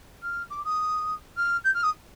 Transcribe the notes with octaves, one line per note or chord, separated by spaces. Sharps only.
F6
D6
D#6
F6
G6
F6
D#6